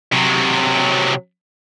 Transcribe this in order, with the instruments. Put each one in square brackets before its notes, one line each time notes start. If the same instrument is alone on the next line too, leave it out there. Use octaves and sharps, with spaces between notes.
[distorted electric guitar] C3 F#3